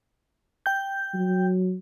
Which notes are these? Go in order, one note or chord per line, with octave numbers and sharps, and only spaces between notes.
G5 G6
F#3